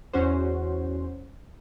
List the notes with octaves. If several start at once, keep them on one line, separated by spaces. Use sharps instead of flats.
E2 C#4 F#4 C5